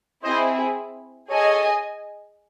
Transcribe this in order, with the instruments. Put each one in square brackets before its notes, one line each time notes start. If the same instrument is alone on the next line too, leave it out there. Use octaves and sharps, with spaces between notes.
[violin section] C4 E4 G#4 [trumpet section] C5 D#5
[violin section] G#4 D#5 G#5 [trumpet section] A4 C#5